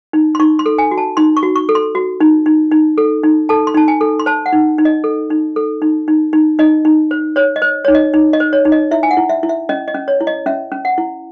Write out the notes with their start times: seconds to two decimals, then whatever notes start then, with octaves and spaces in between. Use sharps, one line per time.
0.13 D#4
0.35 C6
0.40 D#4 C#6
0.59 C6
0.66 A4
0.78 G#5
0.91 F#4
0.98 A5
1.17 D#4 C6
1.37 C#6
1.43 F#4
1.56 C#6
1.69 A4
1.75 C6
1.95 F#4
2.21 D#4
2.46 D#4
2.71 D#4
2.98 A4
3.23 D#4
3.49 A4 A5
3.67 C6
3.75 D#4 A5
3.88 G#5
4.01 A4
4.19 C6
4.26 C5 A5
4.46 F#5
4.53 D#4
4.78 D#4
4.85 D#5
5.04 A4
5.30 D#4
5.56 A4
5.82 D#4
6.08 D#4
6.33 D#4
6.59 D#4 D#5
6.85 D#4
7.11 C5
7.36 C5 C#5
7.56 D#5
7.62 C5
7.85 D#4 C#5
7.95 D#5
8.13 D#4
8.33 D#5
8.40 C5
8.53 C#5
8.65 D#4
8.72 D#5
8.91 E4 E5
9.03 G#5
9.11 F#5
9.17 E4
9.29 E5
9.43 E4
9.49 E5
9.69 C#4 D#5
9.88 D#5
9.94 C#4
10.08 C#5
10.21 E4
10.27 D#5
10.46 C#4 E5
10.72 C#4
10.85 F#5
10.98 E4